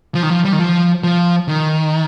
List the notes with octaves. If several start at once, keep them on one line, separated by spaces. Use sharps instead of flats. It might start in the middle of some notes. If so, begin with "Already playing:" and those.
F3
D#3
F3
G3
D#3
F3
F3
D#3